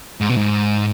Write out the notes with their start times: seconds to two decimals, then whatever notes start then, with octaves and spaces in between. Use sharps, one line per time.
0.21 G#2
0.29 B2
0.37 G#2